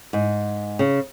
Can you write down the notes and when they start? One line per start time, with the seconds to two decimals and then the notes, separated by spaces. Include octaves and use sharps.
0.13 G#2
0.79 C#3